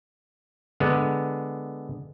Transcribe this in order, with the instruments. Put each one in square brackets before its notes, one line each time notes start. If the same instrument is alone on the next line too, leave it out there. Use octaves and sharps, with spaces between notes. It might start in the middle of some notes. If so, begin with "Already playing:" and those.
[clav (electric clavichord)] D3 G#3 B3